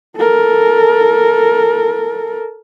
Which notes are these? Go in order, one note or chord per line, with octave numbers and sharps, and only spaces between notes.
A4 A#4